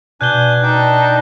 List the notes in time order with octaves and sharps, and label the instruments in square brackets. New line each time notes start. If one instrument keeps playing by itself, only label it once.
[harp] B2 [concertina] D4 G#5 [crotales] F#6 G6 G7
[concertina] D4 G5 [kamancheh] D#4 A5